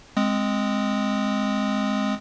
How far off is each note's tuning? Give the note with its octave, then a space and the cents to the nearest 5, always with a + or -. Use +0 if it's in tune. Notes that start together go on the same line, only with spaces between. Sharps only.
G#3 +0 C4 +0 D#6 +0